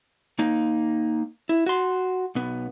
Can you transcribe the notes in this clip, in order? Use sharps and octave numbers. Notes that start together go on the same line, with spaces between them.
A#3 D#4
E4
F#4 C6
B1 B3